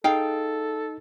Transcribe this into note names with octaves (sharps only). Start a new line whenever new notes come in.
D#4 G#4 A4 F5 G5